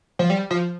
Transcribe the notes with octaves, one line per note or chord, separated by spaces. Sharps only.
F3
G3
F3